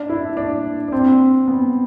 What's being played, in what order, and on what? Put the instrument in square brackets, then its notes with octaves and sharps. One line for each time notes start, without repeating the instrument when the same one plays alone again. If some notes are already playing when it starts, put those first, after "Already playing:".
Already playing: [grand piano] D4
E4
D4
D4
C4
B3